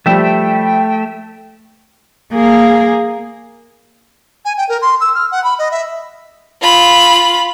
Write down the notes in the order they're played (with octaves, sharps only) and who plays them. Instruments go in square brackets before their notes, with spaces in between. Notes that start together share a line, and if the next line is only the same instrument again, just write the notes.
[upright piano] F3 G3 [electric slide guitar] A3 E5 [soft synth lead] G5
[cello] A#3 G#4
[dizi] G#5
G5
A#4
C6
E6
F6
F#5
B5
D#5
E5
[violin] F4 B5